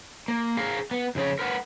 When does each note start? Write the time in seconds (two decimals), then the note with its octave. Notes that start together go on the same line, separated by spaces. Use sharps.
0.28 A#3
0.57 G#4 A#4 F5
0.91 B3
1.15 F2 C#3 G#4 C#5
1.39 A#4 B4 F#5